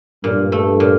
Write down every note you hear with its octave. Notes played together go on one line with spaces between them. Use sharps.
G2 A#2
A3
A#2